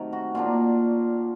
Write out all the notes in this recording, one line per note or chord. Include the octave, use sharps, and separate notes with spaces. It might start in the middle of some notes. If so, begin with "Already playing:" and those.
Already playing: C3 D#3 F#3 A3 A#4
F#4
A#2 F#3 A#3 D4 F4